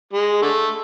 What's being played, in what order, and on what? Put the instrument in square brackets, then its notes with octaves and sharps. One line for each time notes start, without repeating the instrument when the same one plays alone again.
[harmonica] G#3
D3 A3